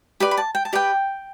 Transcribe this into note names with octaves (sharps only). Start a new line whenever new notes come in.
G4 B4 D5 B5
B5
A5
G5
A5
G4 B4 D5 G5